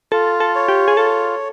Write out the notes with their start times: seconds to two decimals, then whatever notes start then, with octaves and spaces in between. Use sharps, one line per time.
0.12 F4 A4
0.40 A4
0.55 C#5
0.68 G4
0.88 G#4
0.97 F4 A4